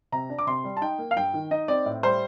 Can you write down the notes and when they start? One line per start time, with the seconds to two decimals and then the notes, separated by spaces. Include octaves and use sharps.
0.12 C3 A#5
0.30 D4
0.39 D6
0.47 C3 C6
0.64 G3
0.77 A5
0.81 D#4 G5
0.98 A#3
1.11 F5
1.16 G2 G5
1.34 D#3
1.51 D#4 D#5
1.68 C4 D5
1.86 A2
2.03 G3 C5